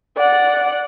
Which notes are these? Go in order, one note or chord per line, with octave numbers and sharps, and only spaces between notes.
D5 F#5